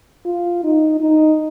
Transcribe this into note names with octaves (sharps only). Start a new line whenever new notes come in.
F4
D#4
D#4